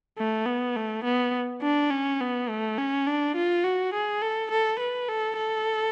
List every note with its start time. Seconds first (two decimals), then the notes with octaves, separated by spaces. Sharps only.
0.18 A3
0.46 B3
0.76 A3
1.04 B3
1.62 D4
1.90 C#4
2.21 B3
2.49 A3
2.78 C#4
3.07 D4
3.36 F4
3.64 F#4
3.94 G#4
4.22 A4
4.51 A4
4.80 B4
5.08 A4
5.37 A4